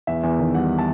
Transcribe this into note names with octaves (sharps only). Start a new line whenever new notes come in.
E2 E5
E2
D#3
G3 F#5
A5